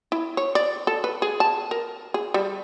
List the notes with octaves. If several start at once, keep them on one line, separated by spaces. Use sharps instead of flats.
E4
C#5
D5
A4
B4
G#4
A5
A#4
G#4
G3